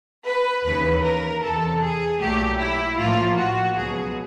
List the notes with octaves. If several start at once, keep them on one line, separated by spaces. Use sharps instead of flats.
B4
D#2 C#3 E3 B4
A#4
E2 C3 E3 A4
G#4
B1 A#2 F#3 A3 G4
E4
A1 A2 F3 A#3 F4
F#4
C#2 B2 F#3 G#4